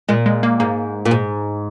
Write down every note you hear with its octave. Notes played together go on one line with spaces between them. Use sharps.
A#2 G#3
G#3
A#3
G#2 A#3
A#2
G#2